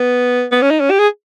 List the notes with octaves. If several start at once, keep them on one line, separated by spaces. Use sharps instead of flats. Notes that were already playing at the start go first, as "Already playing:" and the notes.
Already playing: B3
B3
C#4
D#4
C#4
G4
G#4